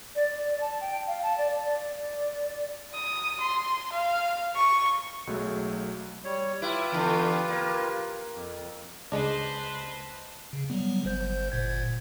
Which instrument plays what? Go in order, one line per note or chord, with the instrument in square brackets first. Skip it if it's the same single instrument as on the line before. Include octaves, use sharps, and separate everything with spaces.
[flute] D5
D5
A5
G5
F5
A5
D5
[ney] D5
[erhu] D#6
C6
F5
C#6
[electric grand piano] B1 F#3 G#3 A3
[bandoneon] G3 C#5
[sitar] E4 [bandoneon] F4 G4 B4
[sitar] E2 D3
A#3
[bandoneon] F2
[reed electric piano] C#2 [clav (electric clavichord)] G#3 D4 [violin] B4 C5 [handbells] D#5 A5
[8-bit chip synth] C#3
F#3 G3 B3
G1 C5 G6
G1 A#2 G#6